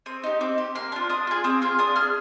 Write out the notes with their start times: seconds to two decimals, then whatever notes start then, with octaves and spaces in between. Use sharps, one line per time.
0.06 C4 D#6
0.24 D#4 G4
0.41 C4 D6
0.58 G4
0.75 A#3 C6
0.92 D4 F4
1.09 D4 D#6
1.27 F4 G#4
1.44 C4 D#6
1.62 F4 G#4
1.79 D4 D#6
1.96 G#4 F6